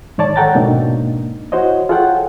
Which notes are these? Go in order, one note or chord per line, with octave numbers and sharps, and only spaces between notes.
G#2 D#3 C#5 D5 A5
A4 C#5 F#5 G5 A#5 A6
G#2 B2 A#3 D4 D#4
E4 F#4 C5 C#5 D#5
F4 G#4 A4 C#5 F#5 G5